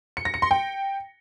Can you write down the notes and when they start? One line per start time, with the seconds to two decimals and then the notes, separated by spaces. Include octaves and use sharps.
0.17 C#7
0.25 A#6
0.34 C#7
0.42 C6
0.51 G5